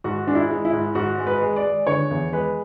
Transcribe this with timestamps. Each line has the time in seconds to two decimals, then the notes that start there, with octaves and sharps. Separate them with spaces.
0.04 G#2 F#4
0.27 G#3 D4
0.35 E4
0.51 G#3
0.65 E4
0.73 G#2
0.95 G#2 F#4
1.18 G#3
1.27 B4
1.41 G#3
1.56 D5
1.65 G#3
1.87 D3 C#5
2.11 E2
2.32 G#3 B4